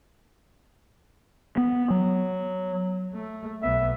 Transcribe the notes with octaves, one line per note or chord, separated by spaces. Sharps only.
B3
F#3
A3
B1 B3 E5